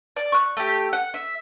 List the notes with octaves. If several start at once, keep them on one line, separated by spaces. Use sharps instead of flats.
D5 D6
C#6 F#6
A3 G4
F#5
E5